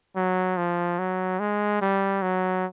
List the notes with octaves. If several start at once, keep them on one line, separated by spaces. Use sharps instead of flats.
F#3
F3
F#3
G#3
G3
F#3